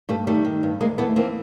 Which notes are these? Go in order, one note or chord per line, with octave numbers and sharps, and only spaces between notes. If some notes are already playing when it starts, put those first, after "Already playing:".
G2 G3 A3
D#3 G3 A3
D#3
G2
D2 G#3 A#3
E3 A3 B3
E3 A#3 C4